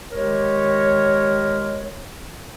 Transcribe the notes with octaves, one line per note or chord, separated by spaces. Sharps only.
D#3 G#3 G4 A#4 C#5